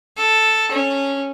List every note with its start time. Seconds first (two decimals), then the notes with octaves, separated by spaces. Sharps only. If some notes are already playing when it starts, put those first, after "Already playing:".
0.17 A4
0.71 C#4